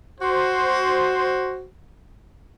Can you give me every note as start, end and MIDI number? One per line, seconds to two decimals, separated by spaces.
0.21 1.66 66
0.21 1.66 72